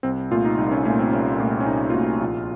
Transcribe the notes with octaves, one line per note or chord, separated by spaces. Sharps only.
C2 C4
A#2 A3 F4
D#4
C2 D#4
C#4
A#2 A3 C#4
C4
C2 C#4
A#2 A3
C#4
C2 D#4
F4
A#2 A3 F#4
A#1 F4